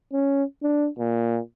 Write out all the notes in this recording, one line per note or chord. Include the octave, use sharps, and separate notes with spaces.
C#4
D4
A#2